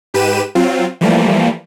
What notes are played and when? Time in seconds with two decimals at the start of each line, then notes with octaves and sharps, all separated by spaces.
0.14 G#2 G4 B4 D#7 E7
0.55 F#3 C4 F4
1.01 E3 F3 G3 A3 A#3